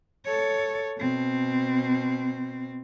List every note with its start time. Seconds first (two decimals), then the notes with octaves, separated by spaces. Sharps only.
0.25 A4 C#5
0.99 B2 C4